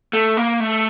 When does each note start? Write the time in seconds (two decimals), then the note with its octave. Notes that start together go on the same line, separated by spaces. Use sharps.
0.13 A3
0.37 A#3
0.60 A3